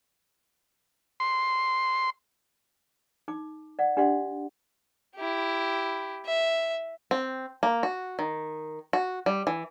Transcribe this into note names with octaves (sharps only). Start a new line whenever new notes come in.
C6
D#4 D6
D5 F#5
D4 G4 D5 F#5 C6
E4 G4
E5
C4
A#3
F#4
D#3
F#4
G3
E3